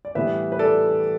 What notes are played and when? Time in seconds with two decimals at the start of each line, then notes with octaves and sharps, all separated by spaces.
0.05 D5
0.15 A2 E3 G3 B3 B4 E5
0.52 B4
0.59 A4 D5